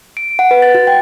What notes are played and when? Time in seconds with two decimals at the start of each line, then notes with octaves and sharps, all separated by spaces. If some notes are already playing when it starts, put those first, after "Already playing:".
0.17 D7
0.39 F#5
0.51 B4
0.62 A6
0.75 F#4
0.87 G5